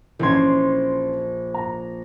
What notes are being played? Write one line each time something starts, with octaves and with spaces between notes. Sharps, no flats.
A#1 E3 C#4 C6 G#6
A#5